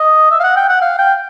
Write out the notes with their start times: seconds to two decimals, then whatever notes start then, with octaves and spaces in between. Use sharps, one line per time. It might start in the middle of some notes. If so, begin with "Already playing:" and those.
Already playing: D#5
0.31 E5
0.40 F5
0.44 F#5
0.56 G5
0.69 F#5
0.82 F5
0.98 G5